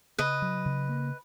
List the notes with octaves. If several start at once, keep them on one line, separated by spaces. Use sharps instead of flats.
C#3 B4 D#5
F#3
C#3
A#3